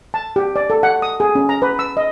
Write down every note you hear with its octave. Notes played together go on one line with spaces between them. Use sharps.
A5
G4
D5
A4
F#5
D#6
G#4
C#4
A#5
B4
E6
D#5